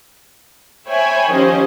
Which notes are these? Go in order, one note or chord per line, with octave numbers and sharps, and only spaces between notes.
C5 C#5 E5 G5 G#5 B5
D#3 F3 C#4 G4 C5 D#5